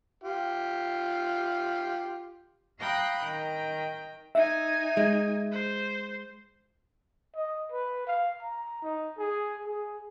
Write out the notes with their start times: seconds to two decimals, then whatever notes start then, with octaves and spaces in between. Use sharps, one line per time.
0.24 F4 G4
2.80 F5 G5 A#5 B5 D#6 F#6
3.21 D#3 G5 A#5
4.35 D#4 E5 G#5
4.97 G#3
5.52 C5
7.35 D#5
7.72 B4
8.07 F5
8.43 A#5
8.82 D#4
9.18 G#4
9.65 G#4